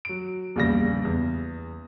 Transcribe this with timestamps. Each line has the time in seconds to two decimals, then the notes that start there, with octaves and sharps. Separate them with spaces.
0.05 F#3 D7
0.56 A#1 E2 C#3 G3 A#6
1.05 E2